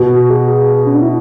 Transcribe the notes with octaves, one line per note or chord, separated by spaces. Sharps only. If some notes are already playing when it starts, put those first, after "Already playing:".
Already playing: B2 F#4
G#4
C#4
D4
E4